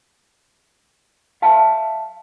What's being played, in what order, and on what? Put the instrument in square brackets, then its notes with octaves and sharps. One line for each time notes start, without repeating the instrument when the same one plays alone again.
[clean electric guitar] E5 F5 A5